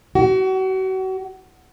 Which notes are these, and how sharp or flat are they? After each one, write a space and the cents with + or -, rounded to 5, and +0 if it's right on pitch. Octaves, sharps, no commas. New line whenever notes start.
F#4 +35